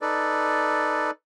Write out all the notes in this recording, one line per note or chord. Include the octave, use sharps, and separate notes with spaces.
D#4 A4 B4 D5